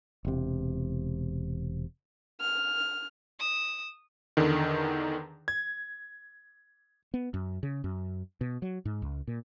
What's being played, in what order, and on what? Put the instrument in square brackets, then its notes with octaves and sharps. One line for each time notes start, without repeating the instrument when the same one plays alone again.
[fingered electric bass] E1 C3
[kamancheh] F6
[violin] D#6 E7
[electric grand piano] E2 D3 D#3
G#6
[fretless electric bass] B3
F#2
C#3
F#2
B2
F#3
G#2
C#2
A#2